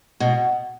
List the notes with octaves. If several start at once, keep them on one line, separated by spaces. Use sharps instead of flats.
B2